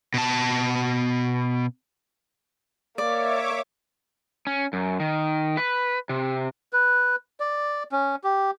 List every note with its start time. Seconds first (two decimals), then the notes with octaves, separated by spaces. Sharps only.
0.14 B2 A5
2.98 A#3 C#5 D5 E5 D6
4.47 C#4
4.73 F#2
5.00 D#3
5.57 B4
6.09 C3
6.73 B4
7.40 D5
7.92 C#4
8.24 G4